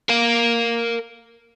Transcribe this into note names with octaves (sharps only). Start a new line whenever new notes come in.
A#4 F5